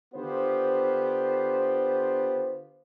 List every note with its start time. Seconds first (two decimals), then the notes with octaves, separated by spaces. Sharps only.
0.15 D3 B3 F4 G4 C5